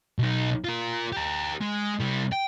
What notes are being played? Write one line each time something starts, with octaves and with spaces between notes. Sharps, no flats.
B1 D#4
F4 A#4
G4 A#4
G#3
C3 G3
G5